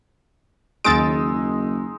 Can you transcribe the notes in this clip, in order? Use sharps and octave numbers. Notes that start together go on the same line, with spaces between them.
F#1 D#2 G#3 D#4 E6 A6 D7